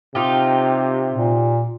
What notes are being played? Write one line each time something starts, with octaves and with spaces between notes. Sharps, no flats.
C3 D#4 F4 G4
A#2